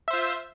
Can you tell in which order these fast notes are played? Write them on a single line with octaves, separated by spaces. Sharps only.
E5 C5 F4